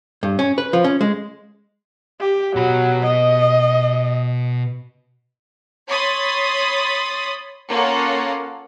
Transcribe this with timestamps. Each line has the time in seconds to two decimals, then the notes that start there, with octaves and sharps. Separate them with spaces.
0.23 G2
0.39 C#4
0.58 B4
0.73 F3
0.84 C#4
1.01 G#3
2.20 G4
2.56 B2 F#3 B5
3.05 D#5
5.87 C#5 B5 C6 D#6 A6
7.70 A#3 C#4 F4 A4 F#5